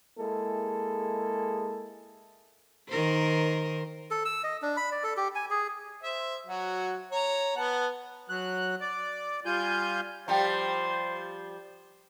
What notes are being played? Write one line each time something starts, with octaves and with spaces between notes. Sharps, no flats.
G#3 A#3 E4 G#4 A4
D#3 A#4 C5
A4
E6
D#5
D4
B5
D5
A4
G4
G#5
G#4
C5 E5
F#3 F#4
C#5 A#5
B3 F#5 A5
F#3 F#6
D5
G3 F4 G#5 G6
F3 G3 C5 G5 A#5